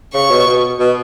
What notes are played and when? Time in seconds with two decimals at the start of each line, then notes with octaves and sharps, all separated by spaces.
0.14 C#3 C#6
0.31 B2
0.47 B2
0.80 B2